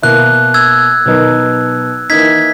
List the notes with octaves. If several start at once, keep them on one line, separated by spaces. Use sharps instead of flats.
B2 A#3 E4 F#6
E6 G#6
B2 F#3 B3 D#4 A#4
E3 A#3 D#4 G#6 B6